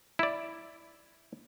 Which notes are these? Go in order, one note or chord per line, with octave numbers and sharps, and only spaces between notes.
E4 D5